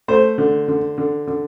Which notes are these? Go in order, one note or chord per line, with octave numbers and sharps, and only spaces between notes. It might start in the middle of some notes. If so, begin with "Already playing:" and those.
A3 C5
D3
D3
D3
D3